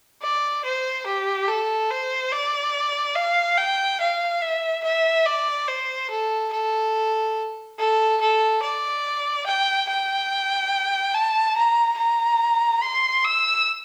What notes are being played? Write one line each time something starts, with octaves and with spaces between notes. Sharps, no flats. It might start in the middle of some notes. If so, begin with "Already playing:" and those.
D5
C5
G4
A4
C5
D5
F5
G5
F5
E5
E5
D5
C5
A4
A4
A4
A4
D5
G5
G5
A5
A#5
A#5
C6
E6